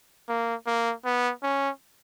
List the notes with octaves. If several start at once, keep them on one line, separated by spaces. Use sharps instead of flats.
A#3
A#3
B3
C#4